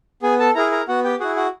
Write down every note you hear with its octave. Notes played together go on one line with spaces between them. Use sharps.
B3 G#4 G#5
A4 A5
E4 G#4 A#4 A#5
A#4 A#5
B3 F#4 F#5
G4 G5
E4 F#4 G#4 F#5
F#4 F#5